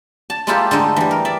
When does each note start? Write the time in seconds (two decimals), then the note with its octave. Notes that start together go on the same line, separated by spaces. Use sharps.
0.30 A5
0.47 G#3 A#3 E4 F4 G4 A4
0.71 D3 G#3 A3 D#4
0.96 E3 G3
1.11 A#4
1.25 D5 E5